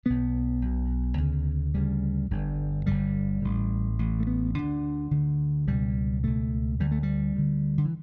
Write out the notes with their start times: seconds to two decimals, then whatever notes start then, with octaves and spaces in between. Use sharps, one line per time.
0.06 B1 B2 B3
0.62 B1 B2
1.18 D2 C#3
1.74 D2 C#3 G3
2.30 G1 G2 D3
2.86 G1 G2 D3 G3
3.42 A1 A2
3.99 A1 A2
4.20 A3
4.27 B3
4.55 D2 D3 D4
5.11 D2 D3
5.67 C#2 B2 G3
6.24 C#2 B2 A3
6.80 D2 D3 G3
6.91 A3
7.03 G3
7.36 D2 D3
7.78 D3
7.85 E3